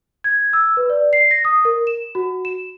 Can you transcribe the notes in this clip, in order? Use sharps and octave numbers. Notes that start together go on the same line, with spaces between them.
G#6
E6
B4
D5
C7
A#6
D#6
A#4
E7
F#4
E7